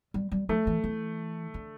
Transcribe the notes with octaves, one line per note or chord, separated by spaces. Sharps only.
G3
G3
F3 A3
E3
E3
D3